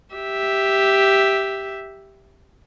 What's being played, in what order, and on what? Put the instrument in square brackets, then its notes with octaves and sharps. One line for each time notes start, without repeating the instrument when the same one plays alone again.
[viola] G4 E5